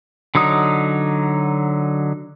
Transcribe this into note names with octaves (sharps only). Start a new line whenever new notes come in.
D3 F#3 D#4 D#6